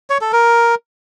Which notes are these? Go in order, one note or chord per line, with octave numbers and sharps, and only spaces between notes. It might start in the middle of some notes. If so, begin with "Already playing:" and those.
C#5
A4
A#4